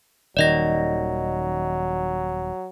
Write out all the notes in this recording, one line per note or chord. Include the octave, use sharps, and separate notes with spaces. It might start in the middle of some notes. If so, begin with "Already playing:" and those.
D#1 D#3 F#3 D5 D#5 A#6